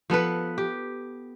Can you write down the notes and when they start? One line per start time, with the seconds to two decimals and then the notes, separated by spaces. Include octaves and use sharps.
0.10 F3 B3 A4 B4
0.58 G4